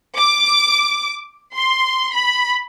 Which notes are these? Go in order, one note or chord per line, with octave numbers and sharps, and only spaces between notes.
D6
C6
B5